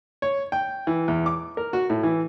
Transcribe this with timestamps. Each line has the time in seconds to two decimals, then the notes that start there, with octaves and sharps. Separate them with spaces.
0.22 C#5
0.52 G5
0.87 E3
1.08 E2
1.26 D6
1.57 A#4
1.73 F#4
1.90 A2
2.03 E3